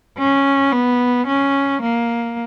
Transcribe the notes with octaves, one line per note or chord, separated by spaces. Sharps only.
C#4
B3
C#4
A#3